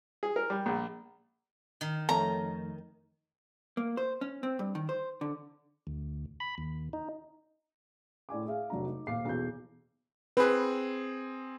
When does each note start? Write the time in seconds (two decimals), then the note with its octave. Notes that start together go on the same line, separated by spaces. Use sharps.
0.23 G#4
0.36 A#4
0.50 G3
0.66 A#1
1.81 D#3
2.09 F2 A3 C#5 A#5
3.77 A#3
3.97 C5
4.21 C#4
4.43 C4
4.59 G2
4.75 D#3
4.89 C5
5.21 D3
5.87 D2
6.40 B5
6.58 D#2
6.93 D#4
8.29 A2 D5 G#5 D6
8.46 G#4 E5 F5
8.70 F1 F#3 D4 A#5
8.86 D#4
9.07 D#1 F5 D6 C7
9.25 B1 E2 G6
10.37 C4 G#4 B4